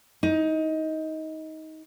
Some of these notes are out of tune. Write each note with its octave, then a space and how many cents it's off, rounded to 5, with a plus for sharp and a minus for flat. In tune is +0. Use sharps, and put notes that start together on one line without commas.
D#4 +20